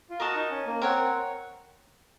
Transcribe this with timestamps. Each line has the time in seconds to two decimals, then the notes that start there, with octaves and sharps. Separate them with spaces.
0.10 F4
0.20 F#4 A#4 D#5 A5 C#6
0.35 D#4
0.51 C#4
0.66 A#3
0.81 C4 A#4 C#5 F#5